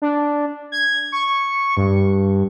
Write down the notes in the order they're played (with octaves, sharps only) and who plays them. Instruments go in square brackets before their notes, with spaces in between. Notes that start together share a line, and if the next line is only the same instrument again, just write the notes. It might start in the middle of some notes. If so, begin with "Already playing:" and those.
[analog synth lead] D4
G#6
C#6
G2